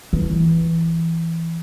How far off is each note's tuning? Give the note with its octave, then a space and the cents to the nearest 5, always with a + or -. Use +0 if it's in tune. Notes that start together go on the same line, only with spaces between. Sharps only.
E3 +5